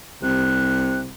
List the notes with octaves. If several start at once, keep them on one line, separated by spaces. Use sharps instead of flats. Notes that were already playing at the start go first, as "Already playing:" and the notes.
C2 C3 F#6